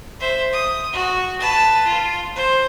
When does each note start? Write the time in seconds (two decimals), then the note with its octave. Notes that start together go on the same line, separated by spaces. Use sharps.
0.20 C5 E5
0.52 D#6
0.93 F#4
1.40 B4 A5
1.85 F4
2.36 C5